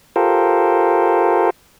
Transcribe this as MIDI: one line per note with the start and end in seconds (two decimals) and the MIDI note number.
0.16 1.50 65
0.16 1.50 67
0.16 1.50 69
0.16 1.50 70
0.16 1.50 72